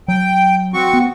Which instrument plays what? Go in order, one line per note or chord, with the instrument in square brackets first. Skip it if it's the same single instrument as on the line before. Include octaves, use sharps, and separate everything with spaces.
[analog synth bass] F#3 [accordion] G5
[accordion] C4 F#4 C#6
[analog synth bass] B3